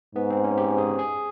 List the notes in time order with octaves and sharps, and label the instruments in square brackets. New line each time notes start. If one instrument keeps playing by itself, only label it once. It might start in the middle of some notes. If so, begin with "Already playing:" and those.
[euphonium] G#2 [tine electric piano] B3
[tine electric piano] C4
C#4
G4
G#4
G#4